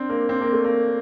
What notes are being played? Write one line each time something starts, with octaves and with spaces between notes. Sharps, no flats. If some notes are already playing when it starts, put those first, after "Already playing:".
Already playing: C4 D4
A#3
C4
A#3
A3
A#3